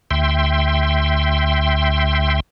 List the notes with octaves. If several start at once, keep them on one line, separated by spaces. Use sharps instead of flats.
D2 E5 G5 C6